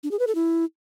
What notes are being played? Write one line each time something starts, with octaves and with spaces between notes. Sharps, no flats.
D4
G#4
B4
A4
E4